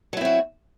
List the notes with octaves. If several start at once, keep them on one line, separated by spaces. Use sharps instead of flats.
F#3 C4 E4 F#4